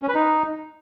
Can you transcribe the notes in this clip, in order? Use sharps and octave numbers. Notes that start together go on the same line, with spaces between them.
C#4
B4
D#4